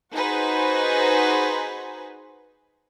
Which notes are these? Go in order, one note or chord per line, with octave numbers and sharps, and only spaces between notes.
D#4 F#4 G#4 B4 C5